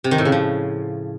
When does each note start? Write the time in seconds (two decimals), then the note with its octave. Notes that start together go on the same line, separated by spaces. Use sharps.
0.04 C3
0.11 D#3
0.18 A2
0.25 C#3
0.32 F3